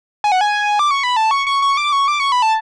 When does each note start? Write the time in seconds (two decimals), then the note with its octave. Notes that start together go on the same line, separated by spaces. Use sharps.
0.24 G#5
0.32 F#5
0.41 G#5
0.79 D6
0.91 C#6
1.03 B5
1.16 A5
1.31 C#6
1.47 C#6
1.62 C#6
1.77 D6
1.92 C#6
2.08 D6
2.20 C#6
2.32 B5
2.42 A5